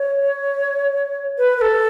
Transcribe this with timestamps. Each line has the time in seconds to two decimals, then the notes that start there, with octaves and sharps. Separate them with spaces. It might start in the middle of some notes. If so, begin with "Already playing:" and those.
Already playing: C#5
1.38 B4
1.57 B4
1.61 A4